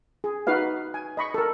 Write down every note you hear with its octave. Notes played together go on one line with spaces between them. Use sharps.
G#4
D#4 F#4 B4 F5
G#5
D#5 B5 C#6
A4 A#4